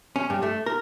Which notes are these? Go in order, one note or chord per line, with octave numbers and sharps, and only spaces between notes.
C#4
G2
A3
A#4